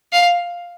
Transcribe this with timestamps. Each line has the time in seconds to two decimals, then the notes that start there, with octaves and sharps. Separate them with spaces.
0.12 F5